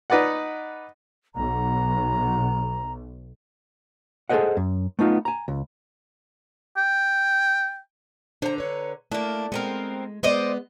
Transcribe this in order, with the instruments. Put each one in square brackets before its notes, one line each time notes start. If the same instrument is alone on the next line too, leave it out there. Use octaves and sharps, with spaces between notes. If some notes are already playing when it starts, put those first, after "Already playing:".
[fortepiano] D#4 B4 D5 D#5 F#5
[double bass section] B1 [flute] A#5
[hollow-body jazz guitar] G#4 A4 B4 C5 D#5 F#5
F#2
A3 B3 D#4 F4
G#5 A#5
C#2
[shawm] G5
[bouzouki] D3 A#5 [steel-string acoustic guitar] D4 C5
[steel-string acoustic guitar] B4 C#5
[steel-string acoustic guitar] A3 E4 [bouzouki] A#3 D4
[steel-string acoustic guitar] G#3 [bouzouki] B3 C4 A#4
[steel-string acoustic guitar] G#3 B3 [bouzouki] C5 D5 D#5